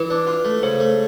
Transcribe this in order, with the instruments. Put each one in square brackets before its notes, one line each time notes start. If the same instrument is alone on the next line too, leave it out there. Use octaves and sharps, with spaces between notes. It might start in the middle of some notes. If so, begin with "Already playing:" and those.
Already playing: [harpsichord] E3 [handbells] B4
[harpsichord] D4
F4
A3
[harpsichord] C#3 [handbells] C5
[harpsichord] A3